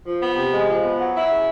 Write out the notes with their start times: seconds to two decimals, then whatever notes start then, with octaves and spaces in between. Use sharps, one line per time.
0.03 F3
0.19 B3
0.34 C3
0.51 G#3
0.66 F3
0.82 B3
0.97 F#3
1.13 E4
1.28 C#3